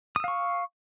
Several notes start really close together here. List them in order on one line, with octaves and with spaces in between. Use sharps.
D#6 E6 F5 C#6